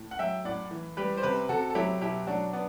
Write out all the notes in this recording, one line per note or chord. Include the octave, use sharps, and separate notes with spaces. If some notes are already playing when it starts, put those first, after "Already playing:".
Already playing: A2
F#5
F#3 E5 G5
A2 D5 F#5
E3
G3 G4 B4
C5
C3 G4 B4
C3 F#4 A4
A4
F#3 E4 G4
B2 E4 G4
F#3 D4 F#4
B3 D4